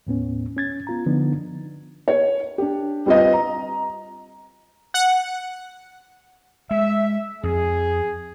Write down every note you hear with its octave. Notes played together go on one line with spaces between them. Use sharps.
D#2 A2 B3 C#4
C#4 G#6 A6
B3 F4 A#5
D3 F3 B3 D4 D#4
C#5
D4 G4
G3 C4 F4 B4 D#5
A#5
F#5
G#3 E5
F2 G#4